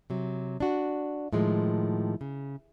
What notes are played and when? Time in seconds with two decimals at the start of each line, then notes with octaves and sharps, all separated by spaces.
0.10 C3 F#3
0.60 D4 F#4
1.33 A2 D#3 F3 G#3
2.21 C#3